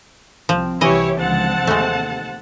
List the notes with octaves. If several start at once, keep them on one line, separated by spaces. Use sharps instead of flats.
C2 F3 C4
C2 C3 E3 E4 G4 C#5 D#5
C#2 D3 F3 C4 F#5 A5
D#2 C3 G#3 A3